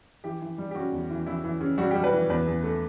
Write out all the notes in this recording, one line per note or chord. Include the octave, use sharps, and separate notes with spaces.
E3 G4
E3
G3
G4
C#3 F#4
E2
E3
E3 E4
E3
C#3
G3 F#4
G4
G3
B4
E3
E2 B4
E2
A3